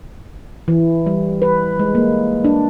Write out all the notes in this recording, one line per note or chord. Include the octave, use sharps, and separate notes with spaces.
E3
G3
B4
G#3
A#3
D4